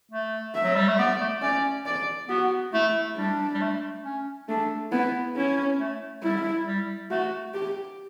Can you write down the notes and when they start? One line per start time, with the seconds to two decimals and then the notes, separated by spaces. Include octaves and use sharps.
0.12 A3
0.55 E5
0.64 F#3
0.76 G3
0.88 A3
0.99 B3 D5
1.21 A3
1.42 C#4 D5
1.86 D5
2.29 B3 F#4
2.73 A3 E4
3.17 G3 D4
3.54 G3
3.61 A3
4.05 C#4
4.48 A3 D4
4.92 B3 E4
5.36 C#4 E4
5.80 A3
6.23 G3 E4
6.67 G3
7.11 A3 F#4
7.54 G4